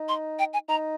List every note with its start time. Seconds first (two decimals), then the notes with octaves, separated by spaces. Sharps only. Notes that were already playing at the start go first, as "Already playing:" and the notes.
Already playing: D#4
0.08 C6
0.39 G5
0.53 G#5
0.69 D#4 A#5